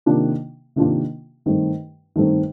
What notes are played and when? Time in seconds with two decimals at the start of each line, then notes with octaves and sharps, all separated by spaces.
0.06 C3 D#3 A#3 D4 F4
0.76 C3 D#3 A#3 D4 F4
1.46 G2 D#3 A3 C4 D#4
2.16 G2 D#3 A3 C4 D#4